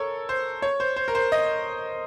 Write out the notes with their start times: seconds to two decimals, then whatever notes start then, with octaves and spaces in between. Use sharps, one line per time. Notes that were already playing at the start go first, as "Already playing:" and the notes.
Already playing: A4 A#4 C#5
0.29 C5
0.62 C#5
0.80 C5
0.96 C5
1.08 A#4
1.15 C5
1.32 D#5